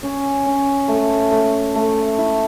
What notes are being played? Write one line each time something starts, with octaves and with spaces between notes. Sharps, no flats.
C#4
C#4
A3
A3
A3
E4